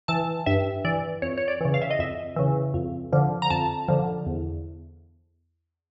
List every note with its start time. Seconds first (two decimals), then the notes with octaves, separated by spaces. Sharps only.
0.08 E3 A5
0.46 G2 E5
0.85 E3 D5
1.22 F2 C#5
1.38 C#5
1.48 D5
1.61 C#3 E3
1.74 F5
1.82 E5
1.91 D#5
1.99 F2 E5
2.36 C#3 E3
2.74 F2
3.13 D3 F3
3.42 A#5
3.50 F2 A5
3.88 D3 F3
4.26 E2